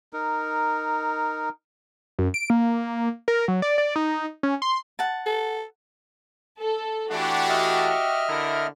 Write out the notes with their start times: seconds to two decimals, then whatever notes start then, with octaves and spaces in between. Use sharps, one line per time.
0.13 D#4 A#4
2.19 F#2
2.34 D7
2.50 A#3
3.28 A#4
3.48 F#3
3.62 D5
3.78 D5
3.96 D#4
4.43 C#4
4.62 C6
4.99 F#5 A5
5.26 A4
6.60 A4
7.11 E3 A3 D4 F#4 G4
7.49 D#5 E5 F6
8.29 D3 E4 A#4